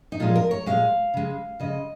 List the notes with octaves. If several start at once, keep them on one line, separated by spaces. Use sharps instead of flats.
D#4
A#2 F3 G#3 F4
A#4
C#5
A#2 F3 G#3 F5
C#3 G#3
C#3 G#3 D#5